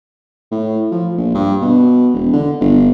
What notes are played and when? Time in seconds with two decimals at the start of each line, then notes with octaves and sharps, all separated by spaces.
0.52 A2
0.92 F3
1.18 A#1
1.35 G2
1.61 B2
2.14 E1
2.33 D3
2.60 G1